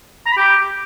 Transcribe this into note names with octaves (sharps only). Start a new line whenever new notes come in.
A#5
B5
G4